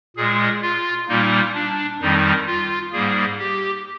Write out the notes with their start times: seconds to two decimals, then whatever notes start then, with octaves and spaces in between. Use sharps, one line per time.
0.16 A#2 G#3 G#4
0.62 F4
1.08 A#2 G3 A#3 D#4
1.54 D4
2.01 F2 D#3 G3 D#4
2.47 F4
2.92 G#2 G3 A#3 G#4
3.39 G4